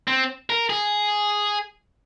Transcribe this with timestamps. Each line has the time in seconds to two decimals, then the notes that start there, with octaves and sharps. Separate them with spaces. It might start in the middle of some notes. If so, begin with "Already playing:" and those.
0.08 C4
0.50 A#4
0.70 G#4